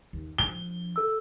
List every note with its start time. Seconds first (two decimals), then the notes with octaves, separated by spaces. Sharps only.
0.13 D#2
0.38 F3 D4 G7
0.96 A4 E6